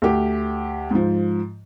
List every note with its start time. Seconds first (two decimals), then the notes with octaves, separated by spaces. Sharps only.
0.02 D2 G4
0.91 G#2 F3